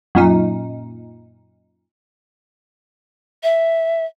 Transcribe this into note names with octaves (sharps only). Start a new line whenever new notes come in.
F#2 A#2 D#4
E5